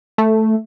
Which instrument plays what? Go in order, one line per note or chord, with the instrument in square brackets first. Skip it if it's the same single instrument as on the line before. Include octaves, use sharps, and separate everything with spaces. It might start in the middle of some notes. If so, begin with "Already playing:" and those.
[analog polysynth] A3